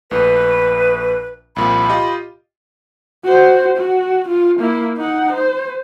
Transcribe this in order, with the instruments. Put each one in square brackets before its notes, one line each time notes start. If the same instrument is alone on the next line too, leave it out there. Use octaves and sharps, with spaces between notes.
[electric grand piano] A#1 A2 [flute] B4
[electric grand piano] C2 A#2 F3 [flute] B5
[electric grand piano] F4 G4 D#5
[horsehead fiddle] F#4 C5
F#4
F4
A#3 E4
D#4 F#5
C5